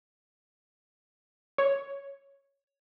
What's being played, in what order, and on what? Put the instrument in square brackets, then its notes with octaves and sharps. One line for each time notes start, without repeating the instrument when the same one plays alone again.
[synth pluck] C#5